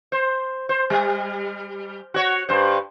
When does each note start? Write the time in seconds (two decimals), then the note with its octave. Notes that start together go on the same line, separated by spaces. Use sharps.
0.12 C5
0.69 C5
0.90 G3
2.14 F#4 C#5
2.49 G2 C5